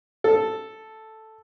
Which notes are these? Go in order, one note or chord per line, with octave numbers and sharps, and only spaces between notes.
A4